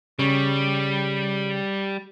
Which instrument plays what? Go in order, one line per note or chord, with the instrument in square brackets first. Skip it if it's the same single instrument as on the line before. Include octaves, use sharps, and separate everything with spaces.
[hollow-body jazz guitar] C#3 [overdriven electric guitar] G3